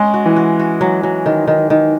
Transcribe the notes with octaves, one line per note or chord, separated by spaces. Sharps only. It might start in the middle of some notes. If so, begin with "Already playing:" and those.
Already playing: G#3 C#4
F#4
E3
F#4
F#4
F#3
F#3
D#3
D#3
D#3